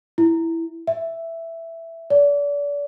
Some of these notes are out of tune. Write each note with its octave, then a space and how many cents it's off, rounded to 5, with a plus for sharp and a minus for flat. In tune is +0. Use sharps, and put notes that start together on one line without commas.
E4 +0
E5 +5
D5 -35